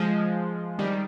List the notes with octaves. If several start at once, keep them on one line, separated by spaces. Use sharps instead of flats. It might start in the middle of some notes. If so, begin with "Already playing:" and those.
Already playing: F3 G#3
D#3 G3